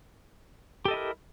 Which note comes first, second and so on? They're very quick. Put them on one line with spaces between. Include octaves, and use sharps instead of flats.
G4 A4 D#5 E4 A#4